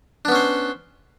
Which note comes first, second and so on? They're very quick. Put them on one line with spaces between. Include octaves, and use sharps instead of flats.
D4 B3 C#4 C5